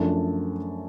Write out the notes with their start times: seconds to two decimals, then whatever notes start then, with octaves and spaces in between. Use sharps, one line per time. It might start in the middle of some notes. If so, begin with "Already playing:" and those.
Already playing: F#2 F3 A3 D4